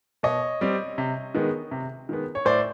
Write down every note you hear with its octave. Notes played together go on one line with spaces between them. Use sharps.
B2 C#5 D#5
G3 C4
C3
D#3 G#3 B3
C3
D#3 G#3 B3
C#5
A2 C5 D5